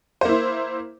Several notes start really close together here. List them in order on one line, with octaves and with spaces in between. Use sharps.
C5 A#3 E4